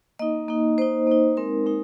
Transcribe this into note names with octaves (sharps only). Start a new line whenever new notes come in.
A#3 D#4 D#5
A#3 D#4
A#3 D#4 C5
A#3 D#4
G#3 C4 D#4 A#4
G#3 C4 D#4